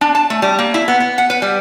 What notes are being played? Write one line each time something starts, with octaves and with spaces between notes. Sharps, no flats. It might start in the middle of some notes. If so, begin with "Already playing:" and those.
D4
A5
A3
G3
A#3
E4
B3
B3
F#5
B4
G3